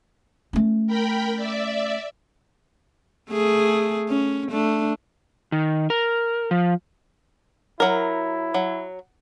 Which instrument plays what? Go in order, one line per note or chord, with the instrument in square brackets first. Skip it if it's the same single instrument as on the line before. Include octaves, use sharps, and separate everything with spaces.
[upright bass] A3 C#4
[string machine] A#4 G5 B5
D5 E5
[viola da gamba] A3 G#4
C#4
A3 D4
[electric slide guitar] D#3
A#4
F3
[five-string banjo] F#3 A#4 [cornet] E4
[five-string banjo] F#3